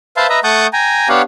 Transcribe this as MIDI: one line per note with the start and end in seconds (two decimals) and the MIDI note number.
0.17 0.27 71
0.17 0.27 72
0.17 0.27 76
0.17 0.27 77
0.17 0.27 81
0.17 0.27 84
0.29 0.39 71
0.29 0.39 75
0.29 0.39 76
0.29 0.39 82
0.44 0.67 57
0.44 0.67 78
0.44 0.67 81
0.44 0.67 85
0.44 0.67 87
0.44 0.67 91
0.73 1.08 79
0.73 1.08 80
0.73 1.08 82
1.09 1.22 59
1.09 1.22 62
1.09 1.22 67
1.09 1.22 73
1.09 1.22 77
1.09 1.22 78